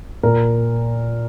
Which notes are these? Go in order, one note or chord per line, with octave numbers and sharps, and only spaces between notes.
A#2 A#4